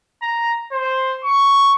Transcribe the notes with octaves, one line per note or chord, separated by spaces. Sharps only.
A#5
C5
C#6